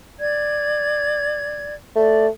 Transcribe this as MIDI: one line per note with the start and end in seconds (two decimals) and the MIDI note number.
0.20 1.73 74
0.20 1.73 92
1.96 2.28 57
1.96 2.25 74